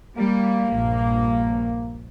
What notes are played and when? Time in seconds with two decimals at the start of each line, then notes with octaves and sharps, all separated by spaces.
0.17 G3 A#3
0.69 A#1 G2